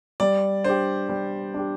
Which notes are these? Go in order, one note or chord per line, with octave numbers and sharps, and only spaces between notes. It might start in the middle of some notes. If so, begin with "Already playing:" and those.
G3 D5
D4 G4 C5
G3
D4 G4